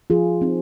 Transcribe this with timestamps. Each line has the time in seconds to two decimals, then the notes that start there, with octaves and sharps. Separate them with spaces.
0.10 F3 F4 G#4
0.42 C4 D#4